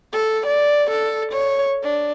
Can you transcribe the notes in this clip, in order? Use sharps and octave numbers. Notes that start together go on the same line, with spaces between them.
A4
D5
A4
C#5
D4